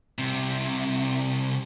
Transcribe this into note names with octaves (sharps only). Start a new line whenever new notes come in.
C2 C3